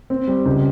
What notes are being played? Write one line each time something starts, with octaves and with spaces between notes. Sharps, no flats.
C4
G3
C#2